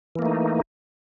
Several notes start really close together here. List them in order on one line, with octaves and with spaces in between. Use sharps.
E3 A#3 A3 D#4